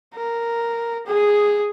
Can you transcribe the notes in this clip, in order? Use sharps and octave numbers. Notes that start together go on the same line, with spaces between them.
A#4
G#4